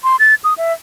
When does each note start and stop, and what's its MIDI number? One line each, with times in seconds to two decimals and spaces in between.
0.04 0.16 84
0.20 0.35 93
0.44 0.54 87
0.58 0.72 76